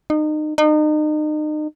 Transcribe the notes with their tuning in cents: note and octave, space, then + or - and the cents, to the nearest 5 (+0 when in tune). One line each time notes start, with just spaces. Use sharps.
D#4 -30
D#4 -35